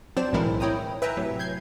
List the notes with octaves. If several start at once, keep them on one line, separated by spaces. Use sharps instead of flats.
F#3 C4 C5 D5 A5 E7
B1 A2 E3 G#3 E4 A#4
E4 C#5 G5 A#5 D#6
B4 E5 G5 G#5 A#5
A2 C3 F#3
G6 G#6 C7